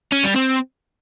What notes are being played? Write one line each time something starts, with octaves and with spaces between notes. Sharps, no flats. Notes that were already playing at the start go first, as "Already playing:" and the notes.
C#4
G3
C4